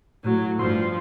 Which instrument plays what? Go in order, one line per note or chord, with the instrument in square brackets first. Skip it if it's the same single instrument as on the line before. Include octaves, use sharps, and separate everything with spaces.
[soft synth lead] A2 [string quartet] F#3
[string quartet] G2 F3 [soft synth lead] C6